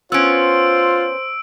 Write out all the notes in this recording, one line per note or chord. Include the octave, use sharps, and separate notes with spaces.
B3 C#4 F4 C5 E6 D7